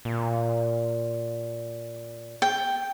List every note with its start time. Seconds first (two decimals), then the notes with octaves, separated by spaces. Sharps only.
0.05 A#2
2.42 G5